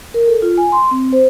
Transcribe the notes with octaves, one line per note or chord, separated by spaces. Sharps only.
A#4
A4
F4
G#5
C6
C4
C5